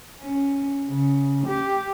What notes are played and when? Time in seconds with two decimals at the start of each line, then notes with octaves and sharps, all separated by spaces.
0.20 C#4
0.89 C#3
1.47 G4